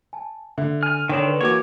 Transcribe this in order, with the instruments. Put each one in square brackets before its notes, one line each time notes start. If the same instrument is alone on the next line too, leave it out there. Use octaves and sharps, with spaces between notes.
[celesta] G#5 A5
[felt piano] D3 [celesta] E5
[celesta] G#5 D#7 [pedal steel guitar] F6
[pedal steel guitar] D3 D#3 [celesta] D4 C#5 E7 [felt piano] G5
[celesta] B4
[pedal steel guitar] E3 C#5 [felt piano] A#3 F#4 D6